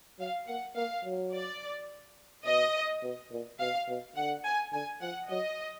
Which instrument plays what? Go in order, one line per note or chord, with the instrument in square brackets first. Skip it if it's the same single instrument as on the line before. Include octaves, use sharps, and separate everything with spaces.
[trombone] F#3 [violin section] F5
[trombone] A#3 [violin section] F#5
[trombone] A#3 [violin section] F5
[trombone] F#3
[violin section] D5
[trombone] B2 [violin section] D#5
[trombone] B2
A#2
[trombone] B2 [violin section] F5
[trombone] B2
[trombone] D3 [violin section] F#5
[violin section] G#5
[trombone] D3 [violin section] G#5
[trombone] F3 [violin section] F#5
[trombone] F#3 [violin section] D#5